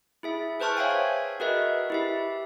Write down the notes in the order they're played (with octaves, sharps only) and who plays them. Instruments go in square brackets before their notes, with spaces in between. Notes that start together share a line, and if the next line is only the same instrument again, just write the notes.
[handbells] E4 G#4 E5
G#4 B4 C5 A5 C#6 F6
C#5 E5 F5 G5 G#5
G#6
F#4 G#4 A#4 B4 D#5 E5
E4 G4 E5